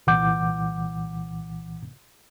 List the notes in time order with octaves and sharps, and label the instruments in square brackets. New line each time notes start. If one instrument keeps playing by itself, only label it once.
[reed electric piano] C2 A#2 E3 F#5 D6 G6